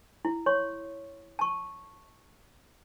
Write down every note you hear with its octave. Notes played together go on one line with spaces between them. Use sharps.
E4
C#5 C6 C#6
A5 C#6